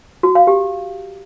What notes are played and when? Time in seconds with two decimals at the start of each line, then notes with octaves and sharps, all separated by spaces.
0.23 F#4
0.35 F5
0.47 G4